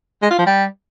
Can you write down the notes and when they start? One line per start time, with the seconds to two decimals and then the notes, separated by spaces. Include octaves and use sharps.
0.23 G#3
0.31 F4
0.38 F3
0.46 G3